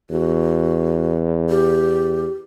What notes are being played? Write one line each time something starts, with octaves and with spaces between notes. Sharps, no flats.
E2 F#4
G4